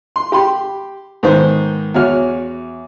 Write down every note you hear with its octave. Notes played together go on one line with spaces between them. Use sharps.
C6
G4 B5 C6
G#2 D#3 B3 C5
E2 F#4 C#5 F6